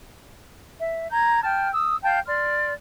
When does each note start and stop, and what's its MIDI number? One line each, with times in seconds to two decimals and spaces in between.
0.80 1.11 76
1.11 1.42 82
1.11 1.42 91
1.11 1.42 92
1.42 1.70 79
1.42 1.70 81
1.42 1.70 89
1.73 1.96 87
1.73 1.96 88
2.03 2.19 77
2.03 2.19 79
2.03 2.19 81
2.03 2.19 91
2.26 2.72 74
2.26 2.72 84
2.26 2.72 89